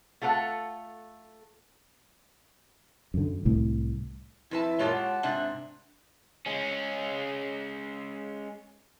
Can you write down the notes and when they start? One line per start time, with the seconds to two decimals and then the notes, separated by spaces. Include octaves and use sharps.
0.22 A3 F4 A4 A#4 F#5
3.14 F#2 D3
3.45 C2 A2
4.51 F2 E4 B4 A5
4.79 F#2 A#2 G#3 F4 G4 C#5 A5
4.92 C#5 F#5
5.23 G#2 C3 D4 E5
6.46 G#3 C#4